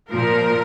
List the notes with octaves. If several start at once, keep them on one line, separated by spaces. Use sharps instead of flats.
A#2 F3 A#4